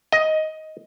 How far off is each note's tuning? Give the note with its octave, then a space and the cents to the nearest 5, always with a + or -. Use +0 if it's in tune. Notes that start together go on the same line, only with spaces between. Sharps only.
D#5 +10